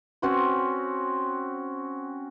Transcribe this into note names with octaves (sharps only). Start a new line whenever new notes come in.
C4 C#4 F#4 C5